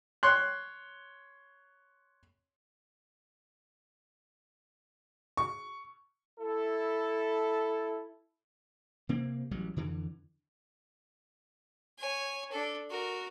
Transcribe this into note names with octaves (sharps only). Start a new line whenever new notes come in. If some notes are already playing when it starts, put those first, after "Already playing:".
C#5 C6 F#6
C#6
E4 A4
C3 A#3 C4
A1 F#3 G3
F2 D3 E3
C#5 G#5
D4 A4
F#4 A#4